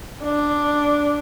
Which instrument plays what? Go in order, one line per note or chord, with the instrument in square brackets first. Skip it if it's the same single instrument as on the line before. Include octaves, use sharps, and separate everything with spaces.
[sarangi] D4